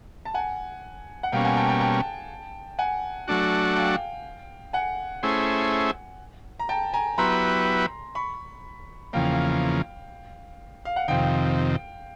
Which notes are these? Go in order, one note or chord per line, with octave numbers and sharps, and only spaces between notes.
A5
F#5 G#5
F#5
B2 G3 A#3 C#4 F5 G5
F#5 G#5
G5 A5
G5 A5
G5 A5
F#5 G#5
F#3 A3 D4 F#4
F5 G5
F#5 G#5
A3 C#4 E4 G#4 C5
A#5
G5 A5
G#5 A#5
F#3 B3 E4 G4 B4 A#5 C6
B5 C#6
E2 C#3 F3 A#3 F5 G5
F5
F#5
F2 C3 D#3 F5 G5